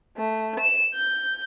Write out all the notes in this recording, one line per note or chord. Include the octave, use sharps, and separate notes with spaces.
A3
E7
G6